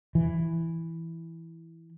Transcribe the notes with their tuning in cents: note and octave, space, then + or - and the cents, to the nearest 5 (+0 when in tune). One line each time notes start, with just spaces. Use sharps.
E3 +0